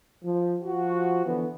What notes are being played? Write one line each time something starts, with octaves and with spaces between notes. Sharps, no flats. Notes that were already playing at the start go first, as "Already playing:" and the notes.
F3
F3 F#4
D3 E3 B3